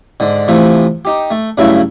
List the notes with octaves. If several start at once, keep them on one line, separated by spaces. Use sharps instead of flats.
G#2 D3
C3 E3 F3 A3
D#4 G4
A3
G2 C#3 F#3 A3 E4